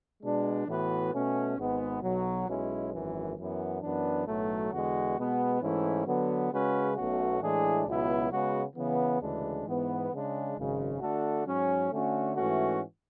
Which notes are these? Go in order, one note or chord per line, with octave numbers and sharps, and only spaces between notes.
B2 G#3 D4
A2 E3 B3 F#4 B4
B2 A3 C#4
G#1 G#2 G#3 B3
B1 B2 F#3
B1 B2 G#3 C#4 E4
G#1 F#2 E3
F#2 E3 B3
F#2 E3 B3 D4
B1 A2 F#3 A3
E2 D3 G#3 B3 F#4
B2 G#3 B3
G#2 E3 A3 C#4 E4
D3 F#3 B3
C#3 G#3 C#4 F#4 B4
B1 B2 A3 C#4 F#4
A2 E3 G#3 D4 G#4
C#2 B2 F#3 B3 E4
C#3 G#3 B3 F#4
C#3 E3 B3
D2 C#3 E3 G#3 D4
G#2 E3 B3
C#3 G#3 D4
G#1 F#2 C#3 G#3
D3 A3 D4 F#4 A4
G#2 F#3 C#4
D3 A3 C#4 F#4
G#2 E3 A3 C#4 F#4